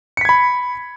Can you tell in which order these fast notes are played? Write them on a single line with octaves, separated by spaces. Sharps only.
C#7 B6 G#6 B5